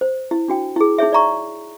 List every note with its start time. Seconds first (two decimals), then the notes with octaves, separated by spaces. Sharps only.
0.01 C5
0.31 E4
0.48 D4 F#4 G5
0.76 E4 G#4
0.98 D#4 G#4 C#5 E5
1.13 D5 E5 A#5 C#6